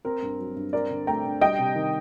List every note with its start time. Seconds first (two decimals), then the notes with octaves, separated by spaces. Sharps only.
0.05 C4 A#4
0.22 G2
0.39 F#3
0.56 G2
0.73 C4 A#4 D5
0.90 D3
1.07 A3 G5 A#5
1.24 D3
1.41 G3 D#5 G5
1.59 C3
1.75 D#3